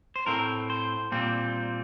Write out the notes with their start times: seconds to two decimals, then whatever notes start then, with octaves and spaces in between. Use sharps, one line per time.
0.16 C5
0.26 A2 A3 C4 A#4
0.70 C5
1.12 A#2 G3 C4